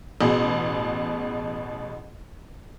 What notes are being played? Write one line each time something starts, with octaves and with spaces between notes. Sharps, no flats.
A1 B2 G#4